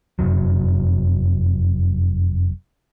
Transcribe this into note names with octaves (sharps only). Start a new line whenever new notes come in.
F1 C2 F#2 F#3